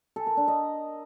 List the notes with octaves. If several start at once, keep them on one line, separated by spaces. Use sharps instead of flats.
A4
A#4
D4
D#5